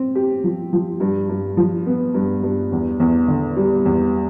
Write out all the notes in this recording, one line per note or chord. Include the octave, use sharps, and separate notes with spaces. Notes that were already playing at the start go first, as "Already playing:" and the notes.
Already playing: C4
G4
F3
F3
G2
G2
F3
B3
G2
G2
E2
E2
D3
G3
E2